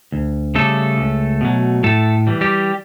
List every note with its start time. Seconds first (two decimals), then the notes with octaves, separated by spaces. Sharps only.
0.12 D2
0.55 C#3 G3 A3 A4
0.98 C#2
1.41 B2 F#3
1.83 A2 A3 A4
2.27 E3 G3
2.41 G3 G4